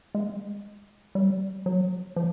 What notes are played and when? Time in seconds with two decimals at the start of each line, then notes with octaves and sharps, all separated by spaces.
0.15 G#3
1.15 G3
1.66 F#3
2.16 F3